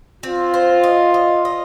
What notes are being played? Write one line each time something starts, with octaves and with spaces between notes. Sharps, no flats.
C4 F4
C5
D#5
D#5
D#5